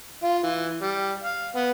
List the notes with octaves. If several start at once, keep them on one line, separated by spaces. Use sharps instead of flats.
F4
E3
G3
F5
B3